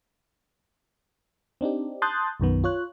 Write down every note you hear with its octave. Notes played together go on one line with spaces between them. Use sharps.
C4 D4 D#4 G4
A5 C6 D#6 F#6 G6 A6
B1 F#2 D#3 B3
F4 C#5 F#6